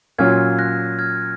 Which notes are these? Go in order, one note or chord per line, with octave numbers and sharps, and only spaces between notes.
A#2 F#3 C#4 F4 F6 G#6
F#6 A#6
F6 G#6